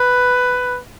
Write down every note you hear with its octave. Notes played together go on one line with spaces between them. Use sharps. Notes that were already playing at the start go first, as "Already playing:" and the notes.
Already playing: B4